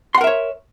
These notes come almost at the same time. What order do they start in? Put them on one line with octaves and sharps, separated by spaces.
C6 F#5 A#4 E5 C#5